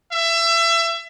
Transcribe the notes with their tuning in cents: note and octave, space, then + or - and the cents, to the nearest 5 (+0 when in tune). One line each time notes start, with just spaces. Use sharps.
E5 +25